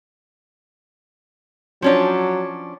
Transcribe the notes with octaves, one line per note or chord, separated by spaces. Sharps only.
F3 F#3 C#4 D4